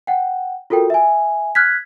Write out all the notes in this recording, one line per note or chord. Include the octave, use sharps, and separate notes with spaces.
F#5 G5
F4 F#4 A4 A#4 G5
E5 G#5
F6 F#6 G#6 B6